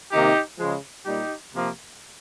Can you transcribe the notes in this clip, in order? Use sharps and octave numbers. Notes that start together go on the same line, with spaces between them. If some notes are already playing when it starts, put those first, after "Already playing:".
C3 D#3 A#3 D#4 G4
C#3 F3 G#3
A#2 G3 A#3 D#4 G4
C3 F3 A#3